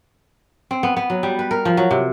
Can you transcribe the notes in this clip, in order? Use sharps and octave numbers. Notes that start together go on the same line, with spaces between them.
C4
B3
B3
F#3
G3
B4
A#4
F3
F#3
C3